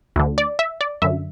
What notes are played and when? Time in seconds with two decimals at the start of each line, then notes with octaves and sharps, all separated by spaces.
0.16 D2 D3
0.38 D5
0.59 E5
0.81 D5
1.02 F#2 D3 E5